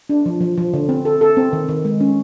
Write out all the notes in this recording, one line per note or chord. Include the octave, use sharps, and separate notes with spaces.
D4
F3
F3
F3
D3
C4
A4
A4
C4
D#3
D#3
G#3
C#4